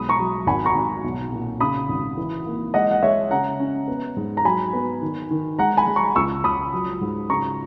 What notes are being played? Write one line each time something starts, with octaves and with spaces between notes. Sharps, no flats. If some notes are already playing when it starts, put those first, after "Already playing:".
Already playing: B1 G#3 B5 D#6
A#5 C#6
F#3
G#1 G#5 B5
A#5 C#6
G#1
B1
A#2
C#3 B5 D#6
G#1
E3
A#3
G#3 D#5 F#5
F#5
G#3 C#5 E5
C#3 F#5 A#5
C#4
B3
G#2
A#5
F#3 G#5 B5
B3
D#3
D#3
G#3 F#5 A#5
G#5 B5
G#3
A#5 C#6
C#2 C#6 E6
C#2 B5 D#6
F#3
G#2
C#3 A#5 C#6